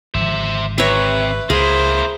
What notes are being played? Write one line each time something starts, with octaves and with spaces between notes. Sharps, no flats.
G#1 D3 F3 C5 E5
C3 B4 C#5 E5
C#2 A#3 E4 G#4 C5